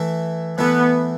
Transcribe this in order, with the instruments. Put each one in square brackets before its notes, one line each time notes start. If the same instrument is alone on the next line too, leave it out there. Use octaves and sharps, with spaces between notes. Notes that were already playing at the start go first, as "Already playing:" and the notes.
Already playing: [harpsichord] E3 A3 E4
[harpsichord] E3 A3 E4 [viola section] B3